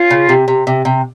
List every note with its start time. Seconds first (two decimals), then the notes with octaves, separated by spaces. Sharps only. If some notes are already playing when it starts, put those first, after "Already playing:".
Already playing: C#4 F4
0.11 C#3
0.29 C3
0.48 C3
0.67 C3
0.85 C3